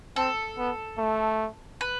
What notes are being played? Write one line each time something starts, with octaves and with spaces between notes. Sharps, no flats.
C4 A4
B3
A3
B4